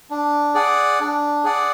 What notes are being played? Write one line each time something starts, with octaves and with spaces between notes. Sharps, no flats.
D4
G#4 D5 F#5
D4
G#4 D5 F#5